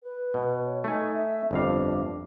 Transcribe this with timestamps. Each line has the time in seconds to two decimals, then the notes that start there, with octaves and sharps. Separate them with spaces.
0.02 B4
0.34 B2
0.65 C#5
0.84 A3 D#4 G#5
1.12 E5
1.51 G1 F2 D4 F5